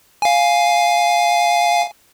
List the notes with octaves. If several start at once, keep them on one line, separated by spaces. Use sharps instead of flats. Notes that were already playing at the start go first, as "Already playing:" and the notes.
F5 G#5